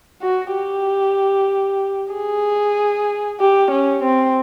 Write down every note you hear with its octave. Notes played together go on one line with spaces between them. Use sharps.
F#4
G4
G#4
G4
C#4
C4